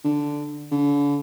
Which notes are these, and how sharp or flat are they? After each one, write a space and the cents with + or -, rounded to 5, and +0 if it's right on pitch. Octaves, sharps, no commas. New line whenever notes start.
D3 -5
D3 -40